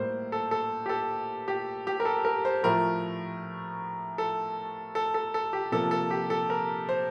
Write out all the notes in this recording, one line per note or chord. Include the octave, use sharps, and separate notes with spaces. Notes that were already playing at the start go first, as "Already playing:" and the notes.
Already playing: A2 G3 A#3 C5
A4
A4
G4
A4
G4
G4
A#4
A4
A#4
C5
A2 F3 A3 A#4
A4
A4
A4
A4
G4
C3 F3 A#3 A4
A4
G4
A4
A#4
C5